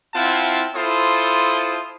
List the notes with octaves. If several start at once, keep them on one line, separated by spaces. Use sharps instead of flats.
C4 E4 F4 F5 F#5 A5
E4 F4 A4 C5 C6 D#6